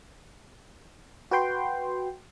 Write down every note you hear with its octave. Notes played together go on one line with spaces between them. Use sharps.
F#4 B4 G5 C6